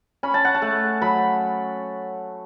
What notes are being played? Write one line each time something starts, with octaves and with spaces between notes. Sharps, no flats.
C#4 B5
A5
F#5
A5
A3
F#3 B5